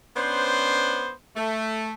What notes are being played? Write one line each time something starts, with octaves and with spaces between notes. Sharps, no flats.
B3 C#4 D4 C5
A3